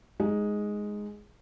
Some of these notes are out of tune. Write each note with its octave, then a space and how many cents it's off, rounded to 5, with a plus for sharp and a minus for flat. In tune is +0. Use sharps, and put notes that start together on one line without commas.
G#3 +0 D#4 +0